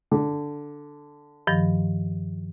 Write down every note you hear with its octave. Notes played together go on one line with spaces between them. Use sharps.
D3
G2 D#3 F3